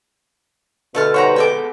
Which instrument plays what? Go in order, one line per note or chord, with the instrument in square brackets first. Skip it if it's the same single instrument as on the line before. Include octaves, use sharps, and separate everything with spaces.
[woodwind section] B2 D3 [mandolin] A3 A5 F6
[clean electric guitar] G3 D#4 C5 [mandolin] C#5 F#5 A#5
[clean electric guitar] G#3 B3 A4 [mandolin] G5 G#5 D6